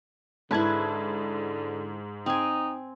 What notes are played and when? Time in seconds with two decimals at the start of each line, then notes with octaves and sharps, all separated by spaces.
0.51 G#2 D3 E4 B4 A5 G#6
2.26 C4 D#4 G#5